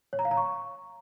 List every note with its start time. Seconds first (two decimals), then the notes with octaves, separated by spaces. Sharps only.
0.13 C#5
0.19 A#5
0.25 F5
0.31 A#5
0.37 C#6